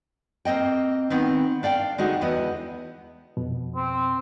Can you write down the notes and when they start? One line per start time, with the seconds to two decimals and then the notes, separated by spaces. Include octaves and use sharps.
0.45 A#3 C4 D#5 G5
1.10 D#3 B3 C4
1.63 D4 D5 F5 G5
1.98 D3 G#3 A3 D#4 F#4
2.21 E2 E3 B3 D#5
3.37 F2 B2
3.76 C4